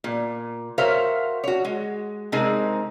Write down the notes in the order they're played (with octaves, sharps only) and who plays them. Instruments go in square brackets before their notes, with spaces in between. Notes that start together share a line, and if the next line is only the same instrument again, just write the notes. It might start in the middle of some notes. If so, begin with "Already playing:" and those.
[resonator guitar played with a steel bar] A#2
F#4 A#4 C5 C#5 E5 F5
F#4 C#5
G#3
C3 G#3 C4 D#4 G#4 A#4